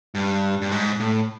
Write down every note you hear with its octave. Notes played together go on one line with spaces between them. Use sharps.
G2
G2
G#2
A2